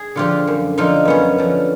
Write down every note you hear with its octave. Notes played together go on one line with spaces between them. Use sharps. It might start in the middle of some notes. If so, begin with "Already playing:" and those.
Already playing: G#4
D3 F3 F4 G4
F#2
D3 F3 D#4 F4
F#2 B3 C#4
D3 F3